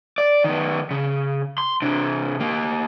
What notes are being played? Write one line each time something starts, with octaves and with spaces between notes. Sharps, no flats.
D5
D#3 B3
C#3
C6
C3 D4
A#3 G4